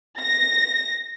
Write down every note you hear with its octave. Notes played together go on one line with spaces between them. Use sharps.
A#6